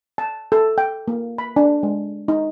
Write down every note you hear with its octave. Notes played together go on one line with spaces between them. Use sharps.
A5
A4
G5
A#3
B5
D4
G#3
D#4